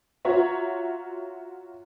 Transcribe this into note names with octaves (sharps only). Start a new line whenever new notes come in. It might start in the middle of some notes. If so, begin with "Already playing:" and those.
F4 F#4 C#5 E5 A#5